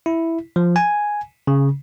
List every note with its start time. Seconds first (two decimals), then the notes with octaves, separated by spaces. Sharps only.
0.06 E4
0.56 F3
0.76 G#5
1.47 C#3